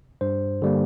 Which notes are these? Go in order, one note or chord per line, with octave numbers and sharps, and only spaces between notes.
G2 C5
D3 G3 A#3